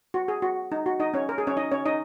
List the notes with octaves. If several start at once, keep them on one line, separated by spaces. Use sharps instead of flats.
F#4
G#4
F#4
D#4
F#4
D#4 D#5
C#4 C#5
A#4
G#4
C#4 C#5
D#4 D#5
C#4 C#5
D#4 D#5